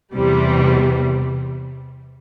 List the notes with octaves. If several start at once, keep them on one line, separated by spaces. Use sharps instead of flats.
E2 C3 E3 G3